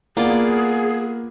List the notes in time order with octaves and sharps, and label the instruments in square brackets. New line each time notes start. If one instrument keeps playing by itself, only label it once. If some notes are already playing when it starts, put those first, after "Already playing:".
[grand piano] A#3 [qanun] B3 F4 D5 [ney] G#4